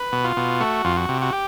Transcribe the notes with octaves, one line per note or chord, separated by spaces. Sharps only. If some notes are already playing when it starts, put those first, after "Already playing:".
Already playing: B4
B2
F4
B2
A3 F#4
F2 F4
F#4
C3
F#4
G4